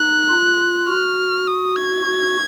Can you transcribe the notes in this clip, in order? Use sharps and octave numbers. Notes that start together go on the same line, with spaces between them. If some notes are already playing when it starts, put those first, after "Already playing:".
Already playing: D#4 F#6
F4
F#4 F6
D#6
G#6
F#4